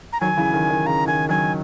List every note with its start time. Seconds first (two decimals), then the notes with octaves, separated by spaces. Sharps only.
0.13 A#5
0.21 D#3 F#3 G#5
0.37 C#3 E3
0.53 D#3
0.70 D#3
0.86 C#3 A#5
1.07 D#3 G#5
1.29 D#3 F#3 G#5